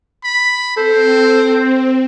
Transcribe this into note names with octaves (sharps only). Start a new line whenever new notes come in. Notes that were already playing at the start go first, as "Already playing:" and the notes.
B5
C4 A4 C5